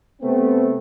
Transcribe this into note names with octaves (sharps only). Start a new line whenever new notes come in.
C3 A3 B3 C4